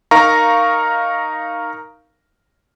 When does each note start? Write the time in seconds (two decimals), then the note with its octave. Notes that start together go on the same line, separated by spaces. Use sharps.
0.11 D#4 A#4 F5 A#5 C#6